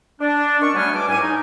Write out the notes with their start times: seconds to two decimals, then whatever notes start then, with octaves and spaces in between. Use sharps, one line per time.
0.21 D4
0.61 D#3 C#4 D4 C#6
0.75 F#3 G3 A3 B3 G#5 F6
0.94 E2 D4 G#5 D6
1.07 C#2 A2 G3 G#5
1.21 D#4